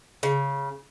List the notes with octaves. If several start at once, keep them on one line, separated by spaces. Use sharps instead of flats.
C#3